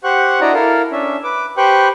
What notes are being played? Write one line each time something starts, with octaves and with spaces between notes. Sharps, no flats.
G4 C5 F#5 C#6 F#6
D4 E4 F#4 D5 D#5 A#5
E4 A4 A#4 F5
C#4 D4 E5
B4 D6
G4 B4 C5 G5 C#6 F#6